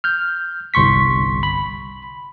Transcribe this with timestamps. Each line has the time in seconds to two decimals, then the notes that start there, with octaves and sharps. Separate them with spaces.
0.04 F6 G6
0.74 G1 C2 C6 C#6 B6
1.43 B5